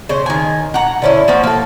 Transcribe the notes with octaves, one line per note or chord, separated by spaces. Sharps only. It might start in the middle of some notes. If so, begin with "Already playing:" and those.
C#3 C5
D#3 G#5
F#5 A#5
D3 C#4 E4
F3 A#3 F#4
A#3 A4